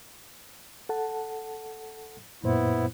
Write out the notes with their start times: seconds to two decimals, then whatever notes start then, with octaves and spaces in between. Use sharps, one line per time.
0.89 A4 F#5 A5
2.44 F#2 A#2 B3 E4 C5